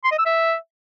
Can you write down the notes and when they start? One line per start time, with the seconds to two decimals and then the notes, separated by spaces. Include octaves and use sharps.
0.04 C6
0.11 D#5
0.19 E6
0.26 E5